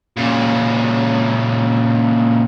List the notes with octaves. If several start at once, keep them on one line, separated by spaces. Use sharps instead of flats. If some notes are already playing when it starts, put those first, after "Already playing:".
A#2 C#3